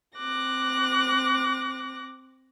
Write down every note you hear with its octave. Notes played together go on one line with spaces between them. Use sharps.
C4 D6 F#6 A#6